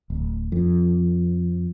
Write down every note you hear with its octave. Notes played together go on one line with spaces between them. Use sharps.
D1
F2